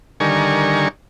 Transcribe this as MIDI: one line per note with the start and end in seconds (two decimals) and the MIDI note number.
0.20 0.88 50
0.20 0.88 51
0.20 0.88 55
0.20 0.88 70
0.20 0.88 80
0.20 0.88 85